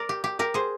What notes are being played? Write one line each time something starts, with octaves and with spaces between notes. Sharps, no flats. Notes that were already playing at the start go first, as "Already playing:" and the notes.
Already playing: A#4 D5
G4
G4
G4 A#4
G#4 C5